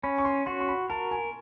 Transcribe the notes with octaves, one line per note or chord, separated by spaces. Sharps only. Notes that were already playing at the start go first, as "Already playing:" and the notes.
C#4 B5
C#6
C6
F#4 C6
C6
B5
A#4 A5
G#5